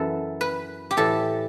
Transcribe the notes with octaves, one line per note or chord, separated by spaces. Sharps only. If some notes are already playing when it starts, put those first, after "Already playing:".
Already playing: F#2 E3 A4
B4
G4
A2 E3 A4